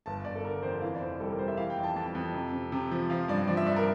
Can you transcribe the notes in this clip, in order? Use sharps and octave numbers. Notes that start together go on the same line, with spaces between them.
G1 A5
G1 D5
A4
D3 A#4
F2 C5
E3 F5
D5
F1 C5
G3 A4
A#4
G3 C5
E5
E3 F5
G5
F2
A5
F2 A5
F2
C3
C3
C3
F3
F3 F5
G2 D5
F3 D5
E5
G2 D5
A#4